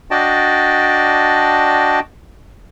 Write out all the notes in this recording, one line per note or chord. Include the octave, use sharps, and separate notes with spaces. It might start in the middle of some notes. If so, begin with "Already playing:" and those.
D4 F#4 D5 D#5 G5 A5